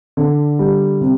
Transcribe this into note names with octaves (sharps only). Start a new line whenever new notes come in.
D3
G3
C3